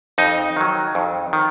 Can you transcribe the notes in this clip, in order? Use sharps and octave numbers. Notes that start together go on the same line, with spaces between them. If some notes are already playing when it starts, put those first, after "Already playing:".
F2 D#4
D#3 F#3
F2
D#3